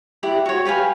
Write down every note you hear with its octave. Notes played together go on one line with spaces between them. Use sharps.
E4 G4 D5 F#5
F#4 C#5
G4 B4 F5 G#5